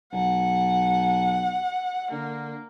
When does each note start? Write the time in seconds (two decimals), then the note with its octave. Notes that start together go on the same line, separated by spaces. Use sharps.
0.13 B1 F#5
2.11 D3 A#3